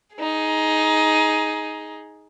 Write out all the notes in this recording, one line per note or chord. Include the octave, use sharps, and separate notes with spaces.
D#4 G#4